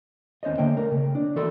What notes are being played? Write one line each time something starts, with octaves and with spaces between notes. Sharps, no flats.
D#2 C#4 C5 C#5 D#5
D3 A#3 C#4 G5
A3 A#4
C#3
D4
E3 F#4 A4 D5 C6